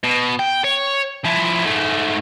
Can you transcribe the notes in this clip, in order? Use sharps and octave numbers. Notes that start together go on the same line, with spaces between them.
B2
G5
C#5
F3 E4
G#2 A3